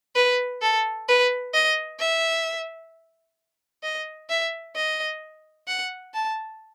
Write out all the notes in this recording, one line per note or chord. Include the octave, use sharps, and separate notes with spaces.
B4
A4
B4
D#5
E5
D#5
E5
D#5
F#5
A5